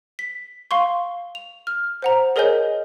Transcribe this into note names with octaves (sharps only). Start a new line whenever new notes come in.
B6
F5 C6 C#6
F7
F6
C5 F#5 A#5
G#4 A#4 C#5 D#5 G#5 G6